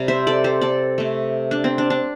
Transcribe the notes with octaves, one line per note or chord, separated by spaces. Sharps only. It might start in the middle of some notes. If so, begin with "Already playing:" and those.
Already playing: C3 G3
C5 E5
A4 D5
G4 C5
A4 D5
C3 A3
D4
C4
D4
D4